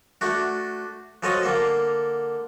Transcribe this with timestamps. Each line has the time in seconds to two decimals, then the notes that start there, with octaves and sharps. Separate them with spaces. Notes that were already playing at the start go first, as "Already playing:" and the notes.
0.21 A3 D4 F#4
1.23 F3 F#3 A4 C#5 D#5
1.43 D3 A#3 A4